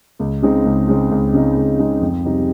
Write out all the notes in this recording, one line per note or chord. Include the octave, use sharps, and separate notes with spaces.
C#2
C#3 G#3 C4 D#4
C#2
C#3 G#3 C4 D#4
C#2
C#3 G#3 C4 D#4
C#2
C#3 G#3 C4 D#4
F2
C3 G3 C4 D#4